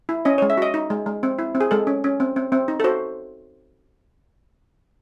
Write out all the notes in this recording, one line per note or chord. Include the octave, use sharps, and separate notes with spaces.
E4
C#4 D#5
G#3 C#5
E5
F#4 D#5
D#4
G#3
G#3
C4
E4
C4
G#4
G#3 A4
C#4
C#4
C4
C4
C4
D#4
A4
F#4 C5